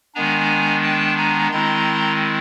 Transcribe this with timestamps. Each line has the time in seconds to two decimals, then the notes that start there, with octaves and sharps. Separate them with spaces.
0.15 D#3 G#3 B3 D4 G#5 A#5
0.83 G5 A5
1.17 G#5 A#5
1.51 D#3 G#3 C4 E4 A#5 C6